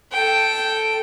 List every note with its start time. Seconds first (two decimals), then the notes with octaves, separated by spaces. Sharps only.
0.12 A4 G5